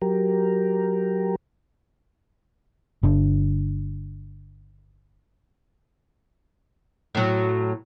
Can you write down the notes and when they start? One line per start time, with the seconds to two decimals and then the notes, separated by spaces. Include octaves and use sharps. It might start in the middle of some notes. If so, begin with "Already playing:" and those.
0.02 F#3 G4 A#4
3.03 G1 D3
7.15 A2 F#3